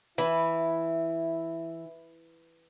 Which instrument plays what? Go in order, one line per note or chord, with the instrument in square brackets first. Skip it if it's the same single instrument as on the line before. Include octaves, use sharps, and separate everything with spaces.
[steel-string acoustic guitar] E3 [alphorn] E4 [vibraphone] E5 [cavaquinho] B5